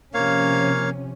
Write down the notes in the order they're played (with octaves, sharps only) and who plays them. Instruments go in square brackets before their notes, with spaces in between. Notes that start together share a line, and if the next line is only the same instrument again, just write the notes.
[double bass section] C3 F3 C#4 [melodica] A#3 C#5 F5